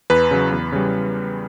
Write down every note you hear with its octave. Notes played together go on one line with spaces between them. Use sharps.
E2 B4
C#3 F#3
E2
C#3 G3